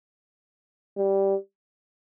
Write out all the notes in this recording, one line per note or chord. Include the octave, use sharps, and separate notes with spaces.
G3